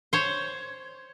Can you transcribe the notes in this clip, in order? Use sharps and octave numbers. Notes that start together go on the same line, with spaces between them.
C5 C#5